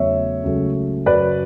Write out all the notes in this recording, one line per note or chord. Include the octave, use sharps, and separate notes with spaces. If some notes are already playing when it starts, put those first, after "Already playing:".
Already playing: E2 C#3 F#3 A3 C#5 E5
C#2 C#3 F#3 A3
F#2 C#3 F#3 B4 D5